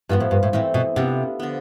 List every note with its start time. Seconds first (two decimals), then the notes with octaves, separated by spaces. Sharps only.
0.09 G2 F3 B3 F4
0.20 A2
0.31 G2
0.43 A2
0.53 A2 E3 A3 C4
0.74 B2
0.96 C3 B3 D4 F4 A4
1.40 D3 F3 B3